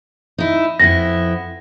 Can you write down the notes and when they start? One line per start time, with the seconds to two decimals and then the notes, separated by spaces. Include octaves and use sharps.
0.38 D#4 E4
0.79 F2 B3 E4 A#6